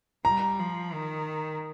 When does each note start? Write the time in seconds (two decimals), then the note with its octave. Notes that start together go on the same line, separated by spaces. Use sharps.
0.25 G3 A#5
0.59 F3
0.93 D#3